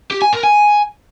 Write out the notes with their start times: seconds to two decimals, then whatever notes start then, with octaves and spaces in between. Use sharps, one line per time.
0.11 G4
0.22 G#5
0.33 A#4
0.43 G#5